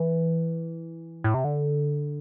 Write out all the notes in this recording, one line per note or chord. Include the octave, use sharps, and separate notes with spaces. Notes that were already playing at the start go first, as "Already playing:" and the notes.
Already playing: E3
A2
C3
D3